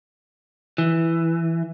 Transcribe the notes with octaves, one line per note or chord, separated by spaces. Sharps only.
E3